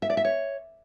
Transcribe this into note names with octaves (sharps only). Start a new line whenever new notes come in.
E5
D5
E5
C#5